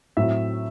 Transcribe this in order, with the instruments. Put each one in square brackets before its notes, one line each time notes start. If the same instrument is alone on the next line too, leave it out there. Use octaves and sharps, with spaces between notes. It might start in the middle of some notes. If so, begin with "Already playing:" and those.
[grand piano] A2 F#3 C4 E5